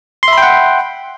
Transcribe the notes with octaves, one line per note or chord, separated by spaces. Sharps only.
E5 F#5 G5 B5 C6